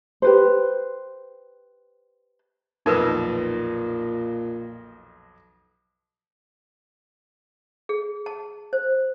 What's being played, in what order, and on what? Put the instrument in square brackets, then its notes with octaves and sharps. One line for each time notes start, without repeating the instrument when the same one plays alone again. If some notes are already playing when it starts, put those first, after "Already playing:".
[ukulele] G4 B4 C5
[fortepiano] B1 F2 [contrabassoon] A#2 [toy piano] D#4 A#4 B4
[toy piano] G#4
A5
C5